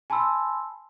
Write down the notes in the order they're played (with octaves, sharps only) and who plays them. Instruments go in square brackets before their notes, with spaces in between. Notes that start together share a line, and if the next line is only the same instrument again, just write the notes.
[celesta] G#5 A5 B5 C6 E6